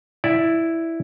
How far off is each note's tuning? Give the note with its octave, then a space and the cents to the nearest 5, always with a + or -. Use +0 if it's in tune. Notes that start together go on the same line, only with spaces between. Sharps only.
E4 +0 D5 +0